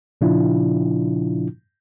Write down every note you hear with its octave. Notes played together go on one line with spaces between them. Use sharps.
A#2 C#3 F3 D4 E4 F4